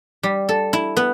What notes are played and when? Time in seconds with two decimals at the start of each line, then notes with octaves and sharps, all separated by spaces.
0.23 G3
0.49 A4
0.73 E4
0.97 B3